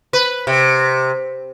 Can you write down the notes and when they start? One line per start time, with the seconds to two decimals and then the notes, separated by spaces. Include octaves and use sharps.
0.13 B4
0.47 C3